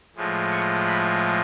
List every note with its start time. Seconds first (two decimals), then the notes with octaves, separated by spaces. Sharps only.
0.16 A2 F3 G#3
0.52 C#6
0.87 B5